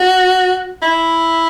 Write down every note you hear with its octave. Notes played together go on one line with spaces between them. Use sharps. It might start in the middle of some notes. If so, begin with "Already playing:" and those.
Already playing: F#4
E4